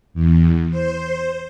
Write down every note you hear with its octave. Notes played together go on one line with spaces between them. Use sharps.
E2
C5